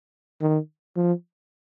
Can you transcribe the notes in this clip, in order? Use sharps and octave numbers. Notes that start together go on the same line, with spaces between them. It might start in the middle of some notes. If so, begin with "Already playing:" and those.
D#3
F3